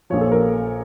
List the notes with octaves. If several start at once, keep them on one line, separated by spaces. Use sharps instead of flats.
A#1 A#2 F3 C#5
A4
A#4